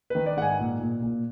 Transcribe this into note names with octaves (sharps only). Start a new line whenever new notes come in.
D#3 B4
D5
G#2 F#5
G#5
A#2
A#2
A#2